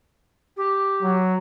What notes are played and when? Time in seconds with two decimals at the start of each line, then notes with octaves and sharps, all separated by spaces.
0.57 G4
1.03 F#3